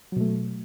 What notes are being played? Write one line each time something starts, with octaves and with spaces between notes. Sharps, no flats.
B2 F#3 A3